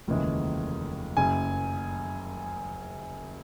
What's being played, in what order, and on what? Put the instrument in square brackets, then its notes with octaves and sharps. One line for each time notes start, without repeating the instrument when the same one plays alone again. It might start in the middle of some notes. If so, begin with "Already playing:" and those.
[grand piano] F1 D#2 C#3 E3 G#3
F#1 F#2 C#3 G#5